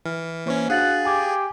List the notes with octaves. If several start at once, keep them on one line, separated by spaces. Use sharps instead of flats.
E3 F6
E3 A#3 C#4 C5 C#6
D4 F#4 G#4 F5 F#5 A6 F#7
G4 G#5 D6 G#6